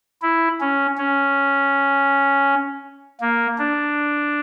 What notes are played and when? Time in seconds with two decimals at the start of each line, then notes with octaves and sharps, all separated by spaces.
0.22 E4
0.60 C#4
0.97 C#4
3.21 A#3
3.58 D4